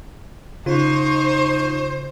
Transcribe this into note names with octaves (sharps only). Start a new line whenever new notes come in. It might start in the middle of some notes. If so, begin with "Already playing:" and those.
C#3 D#4 F4 C5 C#6